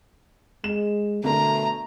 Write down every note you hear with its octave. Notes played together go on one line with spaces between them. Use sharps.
G#3 E7
G1 B2 A3 A#4 A#5